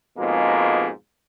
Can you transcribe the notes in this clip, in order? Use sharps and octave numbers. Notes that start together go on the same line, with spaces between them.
F2 G#2 B2 G#3 A#3 F4